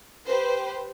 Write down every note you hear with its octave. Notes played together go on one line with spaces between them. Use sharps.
G4 B4 C5